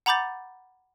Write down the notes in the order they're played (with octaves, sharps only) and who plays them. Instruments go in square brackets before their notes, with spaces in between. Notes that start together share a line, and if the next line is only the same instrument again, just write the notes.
[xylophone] F#5 A#5 B5 D6 G6 A6